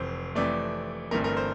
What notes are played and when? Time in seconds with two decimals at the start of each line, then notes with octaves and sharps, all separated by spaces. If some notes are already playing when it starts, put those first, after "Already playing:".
Already playing: F1 F2 E3 C5
0.35 F2 C3 E3 A3 D5
1.11 G1 G2 E3 A3 C4 A#4
1.24 A#4
1.37 C5